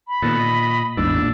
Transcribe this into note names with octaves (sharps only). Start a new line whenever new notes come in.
B5
A#2 D#3 B3 A4
D#5
A1 E2 G#2 D4 E6
A#2